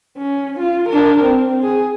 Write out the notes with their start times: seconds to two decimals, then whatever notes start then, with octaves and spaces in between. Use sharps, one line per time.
0.17 C#4
0.59 F4
0.89 D4 A#4
1.23 C4
1.63 G#4